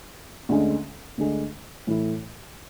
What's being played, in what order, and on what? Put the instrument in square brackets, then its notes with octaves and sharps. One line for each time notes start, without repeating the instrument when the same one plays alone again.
[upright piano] D2 D3 G#3 C#4
D2 D3 G#3
A2 E3 A3 E4